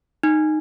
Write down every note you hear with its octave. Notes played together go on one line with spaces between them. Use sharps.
D#4